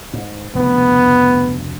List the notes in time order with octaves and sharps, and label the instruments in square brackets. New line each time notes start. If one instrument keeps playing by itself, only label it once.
[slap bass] G#2
[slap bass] F1 D2 C#3 [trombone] B3